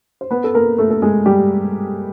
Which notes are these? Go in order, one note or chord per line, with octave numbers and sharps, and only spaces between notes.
C5
B3 B4
A4
A#3 A#4
A3 A4
A4
G#3 G#4
G3 G4